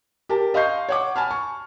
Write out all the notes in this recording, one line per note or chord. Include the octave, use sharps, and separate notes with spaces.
G4 A#4 A5
D#5 F5 C6 C#6 G6 C7
C#5 F#5 D6
G#5 A5 B5 F6
C#6